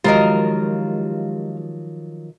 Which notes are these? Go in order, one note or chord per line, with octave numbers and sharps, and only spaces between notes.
D#3 F3 F#3 G#3 F4 G4 A#4 D#5